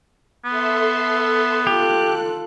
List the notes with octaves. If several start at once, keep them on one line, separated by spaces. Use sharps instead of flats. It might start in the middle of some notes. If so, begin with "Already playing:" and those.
B3 A4 E5 C6
F4 G4 A4 F#6